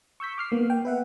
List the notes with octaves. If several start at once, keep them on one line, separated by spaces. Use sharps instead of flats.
C#6 E6 G6 B6
D6 F6 C7
A#3 B3
G5
B4 E5 F#5